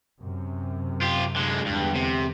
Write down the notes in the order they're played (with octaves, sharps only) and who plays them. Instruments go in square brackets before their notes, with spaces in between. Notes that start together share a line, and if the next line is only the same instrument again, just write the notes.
[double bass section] F#2 C3
[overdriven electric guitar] F4 G4
D3 G#3
[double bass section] E2 D3 G#3 [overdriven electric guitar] G2
[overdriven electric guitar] C3